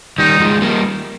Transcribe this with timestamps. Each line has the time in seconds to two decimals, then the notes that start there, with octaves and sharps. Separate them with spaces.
0.18 D#3 G3 D#4
0.40 F3 G#3
0.62 G3 A#3